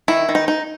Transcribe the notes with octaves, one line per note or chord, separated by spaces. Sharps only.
D#3 E4
D#3
D#4
D#4